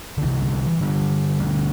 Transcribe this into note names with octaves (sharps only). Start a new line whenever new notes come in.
D3
C2 C3 E3
D3 G3
D3 G3
E3
D3 G3
D2 D3